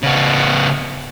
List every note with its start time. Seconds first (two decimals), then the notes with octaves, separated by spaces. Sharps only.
0.03 C#3 B3